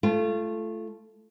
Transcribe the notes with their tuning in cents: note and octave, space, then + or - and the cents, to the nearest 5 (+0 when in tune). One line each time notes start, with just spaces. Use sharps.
A3 -10 F4 -30